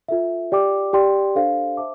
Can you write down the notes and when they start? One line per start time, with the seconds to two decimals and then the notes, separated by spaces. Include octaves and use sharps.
0.08 F4 A4 E5
0.52 G4 D5 G5 D6
0.93 G4 D5 G5 C6
1.35 D4 A4 C5 F5
1.77 C5 E5 A5 D6